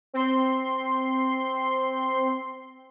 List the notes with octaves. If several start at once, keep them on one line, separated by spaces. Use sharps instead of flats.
C4 C6